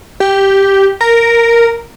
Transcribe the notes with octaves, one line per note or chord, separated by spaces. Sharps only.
G4
A#4